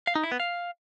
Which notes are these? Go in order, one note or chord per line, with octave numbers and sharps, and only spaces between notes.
F5
D#4
E4
B3
F5